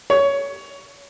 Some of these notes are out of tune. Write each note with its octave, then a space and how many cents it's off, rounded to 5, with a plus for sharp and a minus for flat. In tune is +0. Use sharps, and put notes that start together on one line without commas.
C#5 +15